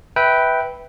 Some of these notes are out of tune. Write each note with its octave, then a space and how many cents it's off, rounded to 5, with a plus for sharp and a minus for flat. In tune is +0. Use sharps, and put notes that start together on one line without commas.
B4 +0 E5 -15 G5 -10